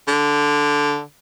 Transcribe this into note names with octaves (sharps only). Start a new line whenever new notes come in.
D3